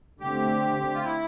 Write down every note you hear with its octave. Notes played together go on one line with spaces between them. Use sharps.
D3 A3 C4 G4
F4
E4